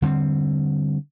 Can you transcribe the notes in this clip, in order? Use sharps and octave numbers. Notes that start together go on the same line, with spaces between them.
D3 G3 B3 C4